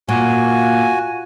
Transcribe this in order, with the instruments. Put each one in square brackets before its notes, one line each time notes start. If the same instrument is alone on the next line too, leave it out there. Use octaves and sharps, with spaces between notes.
[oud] A#2 [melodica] F#4 G#5